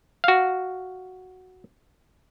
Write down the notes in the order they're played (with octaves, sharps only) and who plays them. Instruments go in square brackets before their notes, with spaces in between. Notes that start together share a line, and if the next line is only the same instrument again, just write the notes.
[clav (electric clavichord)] F#4 F5